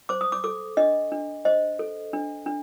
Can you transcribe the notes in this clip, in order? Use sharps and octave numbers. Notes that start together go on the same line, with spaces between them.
C5 D6
D#6
D6
A4 D6
D4 D#5
D4
C5 D#5
A4
D4
D4